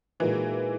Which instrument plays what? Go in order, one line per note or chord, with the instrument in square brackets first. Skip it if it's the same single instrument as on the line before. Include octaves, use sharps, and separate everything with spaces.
[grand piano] A#2 G#3 D#4 F#4 A#4 [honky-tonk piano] E3